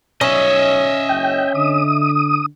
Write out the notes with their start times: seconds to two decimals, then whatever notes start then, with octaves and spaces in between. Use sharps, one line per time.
0.21 B1 C#4 D#5 E5
1.09 F#1 G5
1.55 D3 D#6